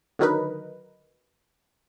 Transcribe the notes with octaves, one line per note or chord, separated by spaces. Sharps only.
D3 D#3 F#3 D#4 A#4 B4